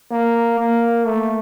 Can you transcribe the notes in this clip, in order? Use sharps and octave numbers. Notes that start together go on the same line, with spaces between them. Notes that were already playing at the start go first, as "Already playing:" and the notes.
A#3
A#3
A3